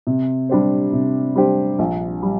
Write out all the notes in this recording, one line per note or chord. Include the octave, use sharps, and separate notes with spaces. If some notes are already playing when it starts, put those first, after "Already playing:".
C3
G3 D4 G4 C5
C3
G3 D4 G4 C5
A#1
G3